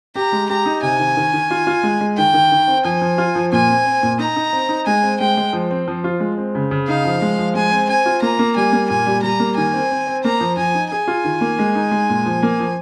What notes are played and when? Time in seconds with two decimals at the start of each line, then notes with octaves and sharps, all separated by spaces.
0.15 G4 A#5
0.32 G#3
0.49 G4 A#5
0.66 D#4
0.82 C3 G#5
0.99 D#3
1.17 D#3
1.33 D#3
1.51 F4
1.67 F4
1.83 G#3
2.01 G#3
2.17 D#3 G5
2.34 D#3
2.52 D#3
2.68 C4
2.84 F3 G#5
3.02 F3
3.18 F4
3.35 F3
3.52 A#2 G#5
3.68 C4
3.86 C4
4.03 A#2
4.19 D#4 A#5
4.36 D#4
4.53 C4
4.69 D#4
4.86 G#3 G#5
5.03 C4
5.20 G#3 G5
5.37 G#3
5.53 F3
5.71 C4
5.88 F3
6.04 F4
6.20 G#3
6.38 C4
6.55 C#3
6.71 C#3
6.88 D#4 F5
7.05 F3
7.22 G#3
7.39 F3
7.55 G#3 G#5
7.71 C4
7.89 C4 G#5
8.06 F4
8.22 A#3 A#5
8.39 A#3
8.56 G3 G#5
8.73 A#3
8.89 A#2 G#5
9.06 G3
9.23 G3 A#5
9.40 A#3
9.57 D#3 G#5
9.74 C4
9.91 C4
10.07 C4
10.24 A#3 A#5
10.40 F3
10.57 F3 G#5
10.75 D#4
10.91 G#4 G#5
11.08 F4
11.24 D#3
11.41 A#3
11.59 G#3
11.75 D#4
11.91 G#3
12.09 A#2
12.26 F3
12.43 A#3
12.60 F3